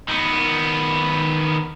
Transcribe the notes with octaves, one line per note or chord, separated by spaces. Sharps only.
D#3 B3